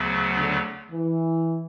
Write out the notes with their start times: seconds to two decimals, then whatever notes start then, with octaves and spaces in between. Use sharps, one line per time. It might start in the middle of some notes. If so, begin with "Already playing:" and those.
Already playing: D2 C#3 F#3 B3
0.37 D3
0.91 E3